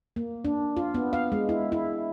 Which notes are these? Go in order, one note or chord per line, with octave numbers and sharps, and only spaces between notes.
A#3
D4
F4
B3
F5
G#3
E4
E4